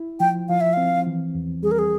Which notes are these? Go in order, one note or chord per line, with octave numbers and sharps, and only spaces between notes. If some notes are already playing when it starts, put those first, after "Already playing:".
Already playing: E4
F3 G5
F3 F5
E5
C4 F5
E3
E2
G3 G#4
A#4
G#4